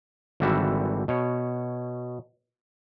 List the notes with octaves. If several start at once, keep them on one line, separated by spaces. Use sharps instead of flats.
G#1 D3 E3 G3 F#4 E5
B2 C#5